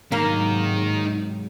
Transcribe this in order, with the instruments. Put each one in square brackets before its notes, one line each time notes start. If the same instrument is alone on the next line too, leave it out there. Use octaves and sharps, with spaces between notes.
[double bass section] G#2 C3 F#3 [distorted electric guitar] D#3 [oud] A#3